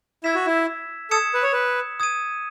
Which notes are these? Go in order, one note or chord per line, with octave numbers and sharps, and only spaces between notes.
E4 E6 G#6 B6 E7
F#4
E4
A4 D#6 G#6 C#7 E7
B4
C#5
B4
D#6 G#6 D#7